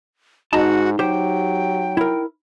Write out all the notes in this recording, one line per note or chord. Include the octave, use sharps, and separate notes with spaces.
G#2 D#4 F#4 A5 A#5
F#3 G4 C5 G5
E4 A#4